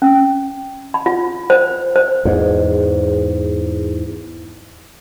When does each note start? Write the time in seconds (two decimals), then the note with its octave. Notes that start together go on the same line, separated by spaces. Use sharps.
0.02 C#4
0.94 B5
1.06 F4
1.50 C5
1.96 C5
2.25 E2 G#2